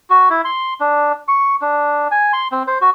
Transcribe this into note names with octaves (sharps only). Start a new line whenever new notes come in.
F#4
E4
C6
D4
C#6
D4
G#5
C6
C4
C5
F#4